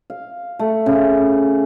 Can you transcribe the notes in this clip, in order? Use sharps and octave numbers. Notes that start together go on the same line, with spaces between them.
F5
A3
C#3